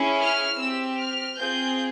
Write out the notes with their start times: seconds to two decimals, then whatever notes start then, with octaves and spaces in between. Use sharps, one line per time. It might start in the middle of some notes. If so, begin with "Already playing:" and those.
Already playing: C#4 E4 G#4
0.20 F6
0.58 C4 G4 E6
0.98 F6
1.37 C4 F4 G#4 G6